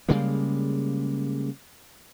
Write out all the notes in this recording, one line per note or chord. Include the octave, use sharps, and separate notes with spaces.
C#3 G3 G#3 A#3